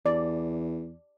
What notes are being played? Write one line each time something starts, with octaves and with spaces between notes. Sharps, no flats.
E2 D5